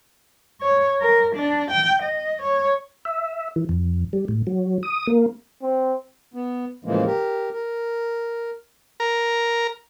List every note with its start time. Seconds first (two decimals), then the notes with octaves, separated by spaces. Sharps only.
0.61 C#5
1.01 A#4
1.35 D4
1.71 G5
2.02 D#5
2.42 C#5
3.05 E5
3.56 E3
3.69 F2
4.13 G3
4.28 A2
4.47 F#3
4.83 D#6
5.07 A#3
5.63 C4
6.34 B3
6.85 A2 C#3 E3 F3 G#3 A#3
7.05 G4 A#4
7.51 A#4
9.00 A#4